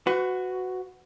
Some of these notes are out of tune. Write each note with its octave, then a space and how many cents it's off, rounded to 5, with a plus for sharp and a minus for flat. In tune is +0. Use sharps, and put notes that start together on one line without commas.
F#4 +0 B4 +30